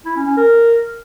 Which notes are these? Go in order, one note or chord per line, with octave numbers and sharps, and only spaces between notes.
E4
C#4
C#4
A#4